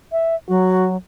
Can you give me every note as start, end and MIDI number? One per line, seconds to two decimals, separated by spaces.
0.12 0.35 76
0.49 0.97 54
0.49 0.87 66